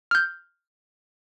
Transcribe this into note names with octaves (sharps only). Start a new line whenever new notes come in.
F6 G6